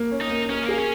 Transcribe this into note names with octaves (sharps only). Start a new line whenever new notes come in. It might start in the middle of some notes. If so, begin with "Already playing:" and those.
Already playing: A#3
C#4
D#4
A#3
C#4 A#4
A#3
G#4
C#4